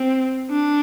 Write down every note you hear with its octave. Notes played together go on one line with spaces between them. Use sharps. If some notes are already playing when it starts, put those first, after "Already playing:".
Already playing: C4
D4